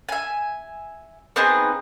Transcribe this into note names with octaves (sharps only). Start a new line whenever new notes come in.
E5 G#5
B3 C4 D#4 G#4